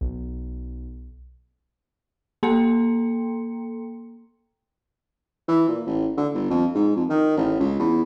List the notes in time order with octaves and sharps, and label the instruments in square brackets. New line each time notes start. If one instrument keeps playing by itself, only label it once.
[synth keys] B1
[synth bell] A#3 A4 G5 A#5 C6 C#7
[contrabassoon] E3
A#2
A1
D3
G1
F2
G#2
F2
D#3
A1
C#2
E2